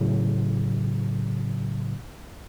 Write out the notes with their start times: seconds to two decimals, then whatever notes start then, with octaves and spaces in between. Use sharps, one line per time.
0.01 A2 C#3 F#3